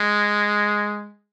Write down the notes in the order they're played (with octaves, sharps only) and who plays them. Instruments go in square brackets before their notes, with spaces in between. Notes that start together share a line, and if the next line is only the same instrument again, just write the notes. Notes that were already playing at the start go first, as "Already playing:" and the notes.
Already playing: [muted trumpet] G#3